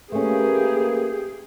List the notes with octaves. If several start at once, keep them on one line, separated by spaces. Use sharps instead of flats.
A3 A#3 C#4 G4 G#4 B4